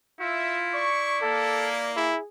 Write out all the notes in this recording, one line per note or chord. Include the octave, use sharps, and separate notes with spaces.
E4 F4 E5
D5 C#6
A#3 A4
E4 G#4